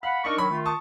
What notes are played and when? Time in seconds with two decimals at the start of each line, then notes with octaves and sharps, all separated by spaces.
0.03 F5 F#5 B5
0.25 D4 D#4 A#4 C#6
0.38 D#3 F#3 B5 C#6
0.50 D#3 A3 F4
0.66 A5 C#6 D#6